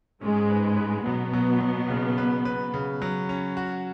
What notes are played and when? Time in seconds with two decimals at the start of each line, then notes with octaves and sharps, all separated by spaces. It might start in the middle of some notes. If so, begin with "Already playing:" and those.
0.21 G#2 G#3 C#4
0.49 B4
0.77 B4
1.05 B2 F#3 B3
1.33 F#3
1.61 F#3
1.89 C#3
2.18 B4
2.45 B4
2.74 C#3
3.02 F#3
3.29 C#4
3.57 F#4